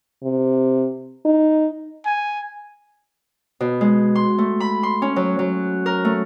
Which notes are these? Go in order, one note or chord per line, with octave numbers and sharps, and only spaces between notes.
C3
D#4
G#5
B2
G#3
C6
A3
B5
C6
C#4
F#3
F#3
A#4
A3